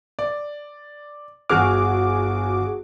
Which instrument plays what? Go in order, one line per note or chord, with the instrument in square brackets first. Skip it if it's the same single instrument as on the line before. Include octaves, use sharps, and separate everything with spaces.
[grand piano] D5
[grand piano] G1 F6 [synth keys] F#4 G#4 D6